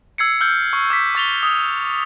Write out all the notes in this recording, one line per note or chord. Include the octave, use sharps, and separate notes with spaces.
E6 G#6 C7 C#7
E6 F6 G6
C#6
D6 G6 B6
C#6 A6 F7 G7
D#6